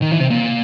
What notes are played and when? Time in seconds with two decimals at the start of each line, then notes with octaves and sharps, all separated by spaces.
0.02 D#3
0.12 E3
0.20 C3
0.30 A#2